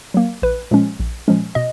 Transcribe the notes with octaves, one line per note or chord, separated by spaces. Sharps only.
F#3 A#3
A#1 B4
A#2 F3 G#3 C#4
A#1
A#2 F3 G#3 C#4
B2 D#5